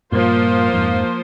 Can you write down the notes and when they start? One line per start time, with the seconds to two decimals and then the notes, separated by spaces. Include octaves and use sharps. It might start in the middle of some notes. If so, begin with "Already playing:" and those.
0.12 G2 A#2 F3 A#3 F4 C5
0.73 F2 G#2